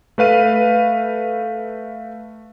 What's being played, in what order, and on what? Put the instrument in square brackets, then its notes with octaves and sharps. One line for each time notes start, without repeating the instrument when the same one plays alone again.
[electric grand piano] A3 B4 F5 D#7